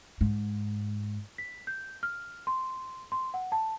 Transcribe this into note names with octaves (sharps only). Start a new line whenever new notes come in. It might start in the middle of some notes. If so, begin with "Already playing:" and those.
G#2
B6
G6
F6
C6
C6
F#5
A5